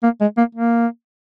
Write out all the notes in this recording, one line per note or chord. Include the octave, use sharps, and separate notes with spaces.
A#3
G#3
A#3
A#3